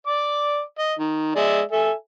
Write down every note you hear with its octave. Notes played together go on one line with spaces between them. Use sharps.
D5 D6
D#5
D#3
G#3 D5 E5
A4 E5 G#5